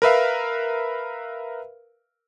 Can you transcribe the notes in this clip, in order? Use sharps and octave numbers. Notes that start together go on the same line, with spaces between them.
A#4 B4 E5 F5